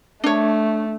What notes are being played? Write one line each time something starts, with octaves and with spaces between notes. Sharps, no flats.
A3 D4 C#5